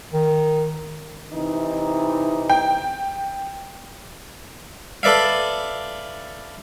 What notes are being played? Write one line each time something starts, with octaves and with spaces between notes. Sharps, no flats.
D#3
C3 E3 D#4
G5
A4 B4 D5 E5 F5